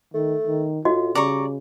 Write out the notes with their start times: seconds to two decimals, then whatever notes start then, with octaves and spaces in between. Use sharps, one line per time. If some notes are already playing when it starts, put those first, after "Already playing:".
0.14 D#3 A3
0.47 D#3
0.85 A2 F4 F#4 D#5
1.15 C#3 G3 D5 A#5 C#6